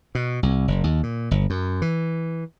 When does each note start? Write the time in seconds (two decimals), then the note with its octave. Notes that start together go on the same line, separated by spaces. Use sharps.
0.15 B2
0.43 C2
0.68 F#1
0.84 D#2
1.03 A#2
1.31 G1
1.50 F#2
1.82 E3